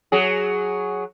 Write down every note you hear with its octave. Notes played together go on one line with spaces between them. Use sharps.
F#3 G#4